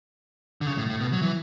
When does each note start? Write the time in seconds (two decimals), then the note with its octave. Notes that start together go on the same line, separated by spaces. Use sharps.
0.61 D3
0.67 C#3
0.77 A2
0.90 A2
1.01 B2
1.12 F#3
1.22 E3